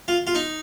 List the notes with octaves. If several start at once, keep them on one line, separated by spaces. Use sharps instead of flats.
F4
F4
D#4